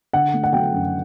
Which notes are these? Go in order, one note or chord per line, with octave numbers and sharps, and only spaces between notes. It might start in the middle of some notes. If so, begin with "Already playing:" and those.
D3 F#5
A3
F#5
F#3 G5
F#2